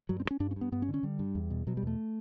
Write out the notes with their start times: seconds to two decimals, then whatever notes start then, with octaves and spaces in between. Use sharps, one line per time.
0.09 G2 F#3
0.20 C4
0.25 G2
0.31 C#4
0.40 G2 D4
0.51 C#4
0.56 G2 B3
0.72 G2 B3
0.82 C#4
0.88 D3
0.94 C#4
1.03 D3 G3
1.19 G2
1.35 E2
1.50 B2
1.67 B2 F#3
1.77 G3
1.82 E2 A3